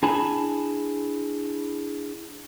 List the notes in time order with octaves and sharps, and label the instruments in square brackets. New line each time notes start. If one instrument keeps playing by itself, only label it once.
[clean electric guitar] D4 E4 G#4 G#5 A5 B5